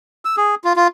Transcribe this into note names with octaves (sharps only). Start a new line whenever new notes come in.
E6
G#4
F4
F4